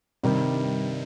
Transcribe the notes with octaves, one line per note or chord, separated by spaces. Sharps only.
G2 C3 D#3 G3